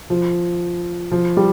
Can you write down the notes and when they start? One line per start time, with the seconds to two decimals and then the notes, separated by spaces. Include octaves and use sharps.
0.10 F3
1.11 F3
1.37 G3